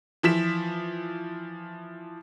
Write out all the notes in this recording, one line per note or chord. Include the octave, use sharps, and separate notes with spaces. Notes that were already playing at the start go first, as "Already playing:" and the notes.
E3 F3 B6 E7